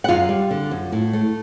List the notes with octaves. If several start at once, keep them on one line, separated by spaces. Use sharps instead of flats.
F#5
F#2 F4 F5
G3
D3
F#2
A2
A3